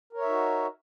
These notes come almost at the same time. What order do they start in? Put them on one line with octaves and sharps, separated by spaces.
A#4 C#5 E5 D#4 F#4